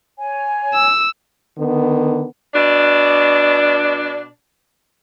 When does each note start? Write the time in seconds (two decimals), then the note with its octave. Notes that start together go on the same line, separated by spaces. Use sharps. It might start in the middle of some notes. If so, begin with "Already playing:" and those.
0.19 C#5 G#5
0.74 E6
1.58 D3 D#3 B3
2.53 B2 D4